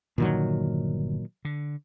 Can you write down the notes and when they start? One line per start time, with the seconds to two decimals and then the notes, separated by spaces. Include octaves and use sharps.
0.18 G1 A#2 D3 D#3 F3 F#3
1.45 D3